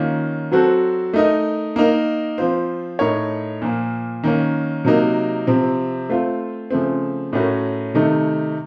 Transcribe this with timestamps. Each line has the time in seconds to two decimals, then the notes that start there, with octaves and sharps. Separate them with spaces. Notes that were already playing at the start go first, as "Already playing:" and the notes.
Already playing: D#3 A#3 C#4 F4
0.52 F#3 C4 F#4 A4 C5
1.14 A3 D#4 A#4 D#5
1.76 A#3 D#4 A#4
2.38 F3 C4 F4 C5
2.99 A2 A3 D#4 A#4 C#5
3.62 A#2 F3 A#3
4.23 D#3 A#3 C#4
4.85 C3 F#3 A#3 D#4 A#4
5.47 C3 F3 C4
6.09 A3 C4 F4 C5
6.70 C#3 F3 A3 C4
7.33 A2 A3 C#4 F#4 A#4
7.94 C3 D#3 A3 D#4